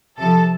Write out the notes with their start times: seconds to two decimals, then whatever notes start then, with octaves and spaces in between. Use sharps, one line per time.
0.18 C3 F3 A4 A5